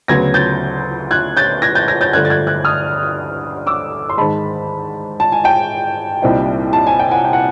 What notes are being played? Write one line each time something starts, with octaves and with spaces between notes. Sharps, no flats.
D2 C#3 F#3 B3 G#6 A#6
G6 A6
F#6 G#6
G6 A6
G#6 A#6
G6 A6
G#6 A#6
G6 A6
G2 D3 F3 A3 F#6 G#6
A6
F#6 G#6
F#6 G#6
D#6 F6
D6 E6
C6
G#2 D#3 G#3 A5 B5
A5
G#5
G5 A5
C2 A#2 G3 C4 D#4
A5
G#5
G5
F#5 G#5
G5
F#5